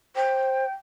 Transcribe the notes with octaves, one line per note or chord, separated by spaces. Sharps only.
C5 G5